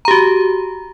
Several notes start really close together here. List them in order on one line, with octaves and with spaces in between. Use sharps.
A#5 G4 F#4